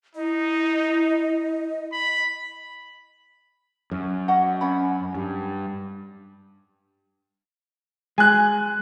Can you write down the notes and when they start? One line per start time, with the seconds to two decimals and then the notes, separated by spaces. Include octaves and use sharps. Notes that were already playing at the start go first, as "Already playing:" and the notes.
0.15 D#4 E4 D#5
1.92 B5
3.91 F#2
4.28 F#4 D#5 F#5
4.61 C#4 F#5 B5
5.15 G2
8.18 G#3 G#5 F#6